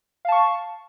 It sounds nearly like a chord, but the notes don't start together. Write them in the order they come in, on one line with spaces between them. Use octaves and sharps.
F5 A5 C#6